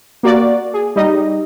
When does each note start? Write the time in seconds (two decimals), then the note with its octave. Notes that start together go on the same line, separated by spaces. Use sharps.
0.23 A#3 F#4 D5
0.74 G#4
0.96 G3 D#4 D#5